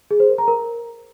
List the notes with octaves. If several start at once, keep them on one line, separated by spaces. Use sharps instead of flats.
G#4
C5
A#4
A#5
A#4